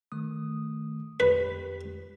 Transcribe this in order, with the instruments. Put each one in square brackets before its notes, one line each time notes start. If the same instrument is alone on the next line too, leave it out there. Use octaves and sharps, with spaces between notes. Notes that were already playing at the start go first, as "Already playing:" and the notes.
[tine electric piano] D#3 A3 D#6
[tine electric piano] F2 G4 [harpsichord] B4